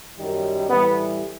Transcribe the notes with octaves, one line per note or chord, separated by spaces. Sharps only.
F#2 D#3 G3
A2 E3 G3 B3